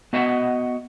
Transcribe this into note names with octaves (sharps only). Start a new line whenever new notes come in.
B3 F#4 D#5 E5 F#5